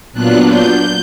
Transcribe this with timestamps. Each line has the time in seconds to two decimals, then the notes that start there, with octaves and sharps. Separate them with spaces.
0.13 A#2 F#3 B3 D4 F4 F#6
0.47 G6